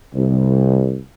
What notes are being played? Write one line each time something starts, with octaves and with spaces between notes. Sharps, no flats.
C2